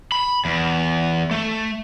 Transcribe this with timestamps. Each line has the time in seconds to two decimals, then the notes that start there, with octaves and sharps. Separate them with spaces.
0.12 B5
0.45 E2
1.31 A3